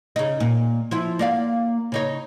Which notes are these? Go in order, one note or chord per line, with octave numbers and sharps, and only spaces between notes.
C#3 D#4
A#2
F3 E4
A#3 D5 F5
C#3 D#4 C#5